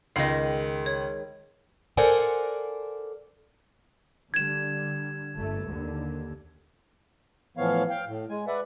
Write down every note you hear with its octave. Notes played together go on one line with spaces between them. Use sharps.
C#2 D#3 G#3 D#5 F5
C#5
A4 A#4 C5 D5 F#5 G#5
D3 G3 G#6 E7
G1 A3
D#2 D3
A2 E3 F3 B3 C#5 F5
F5 G5
A2
G#3 G#5
B4 D5 E5 F#5